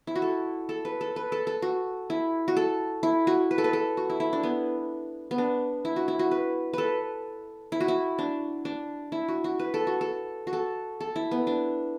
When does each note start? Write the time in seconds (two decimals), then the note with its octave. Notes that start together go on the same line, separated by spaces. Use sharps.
0.07 E4
0.15 F#4
0.22 A4
0.69 A4
0.85 B4
1.01 A4
1.16 B4
1.32 A4
1.47 A4
1.62 F#4
2.10 E4
2.48 F#4
2.57 A4
3.03 E4
3.27 F#4
3.51 B4
3.58 A4
3.64 B4
3.73 A4
3.97 F#4
4.10 E4
4.20 E4
4.33 D4
4.43 B3
5.31 B3
5.38 D4
5.85 E4
5.96 F#4
6.08 E4
6.19 F#4
6.31 B4
6.73 A4 B4
7.72 E4
7.80 F#4
7.88 E4
8.19 D4
8.65 D4
9.12 E4
9.28 F#4
9.44 F#4
9.59 B4
9.74 A4
9.87 F#4
10.01 A4
10.47 F#4
10.53 A4
11.00 A4
11.16 E4
11.31 B3
11.47 D4